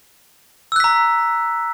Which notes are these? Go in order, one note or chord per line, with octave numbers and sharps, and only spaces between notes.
A#5 E6 F#6 B6